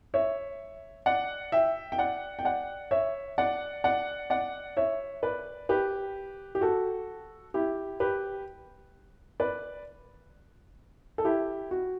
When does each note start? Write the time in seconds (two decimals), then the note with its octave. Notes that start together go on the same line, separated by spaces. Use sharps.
0.14 C#5 E5
1.06 D5 F#5
1.52 E5 G5
1.92 G5
1.98 D5 F#5
2.39 G5
2.45 D5 F#5
2.91 C#5 E5
3.38 D5 F#5
3.84 D5 F#5
4.30 D5 F#5
4.77 C#5 E5
5.23 B4 D5
5.69 G4 B4
6.55 G4
6.61 F#4 A4
7.54 E4 G4
8.00 G4 B4
9.40 B4 D5
11.18 A4
11.25 E4 G4
11.71 F#4